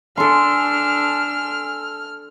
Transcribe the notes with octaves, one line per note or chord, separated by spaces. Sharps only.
D4 A4 G#5 C6 F6